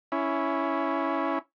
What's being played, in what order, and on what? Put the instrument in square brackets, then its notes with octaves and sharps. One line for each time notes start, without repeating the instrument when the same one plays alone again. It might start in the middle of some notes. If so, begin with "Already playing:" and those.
[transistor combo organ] C#4 E4